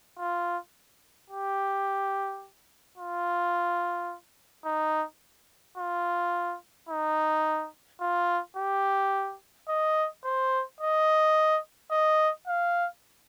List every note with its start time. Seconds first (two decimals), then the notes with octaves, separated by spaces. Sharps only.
0.18 F4
1.30 G4
2.98 F4
4.65 D#4
5.78 F4
6.89 D#4
8.01 F4
8.57 G4
9.69 D#5
10.24 C5
10.80 D#5
11.91 D#5
12.48 F5